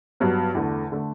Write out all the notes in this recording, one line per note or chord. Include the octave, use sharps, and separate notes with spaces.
G2 F#3 B3
E2 D3 A3
D3 A3